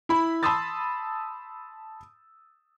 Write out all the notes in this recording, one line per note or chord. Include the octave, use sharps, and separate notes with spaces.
E4 B5
A5 B5 C6 D#6 E6 A6